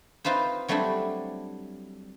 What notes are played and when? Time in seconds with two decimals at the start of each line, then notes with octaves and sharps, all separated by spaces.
0.24 C4 D#4 F4 B4 C5
0.68 F#3 G3 A3 C4 D4 E4